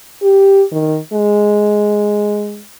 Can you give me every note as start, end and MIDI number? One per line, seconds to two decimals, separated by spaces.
0.22 0.63 67
0.71 0.98 51
1.13 2.62 56